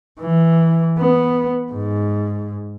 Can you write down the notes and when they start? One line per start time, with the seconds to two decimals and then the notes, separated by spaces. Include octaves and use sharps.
0.20 E3
0.99 B3
1.72 G#2